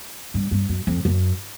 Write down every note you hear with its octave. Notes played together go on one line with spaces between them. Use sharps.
G2
G2
F#2
F2
F#2